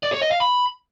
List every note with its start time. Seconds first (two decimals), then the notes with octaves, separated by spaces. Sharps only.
0.03 D5
0.12 C#5
0.22 D#5
0.31 F5
0.40 B5